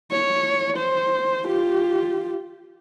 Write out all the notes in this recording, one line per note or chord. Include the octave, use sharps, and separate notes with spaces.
C#5
C5
F4 G4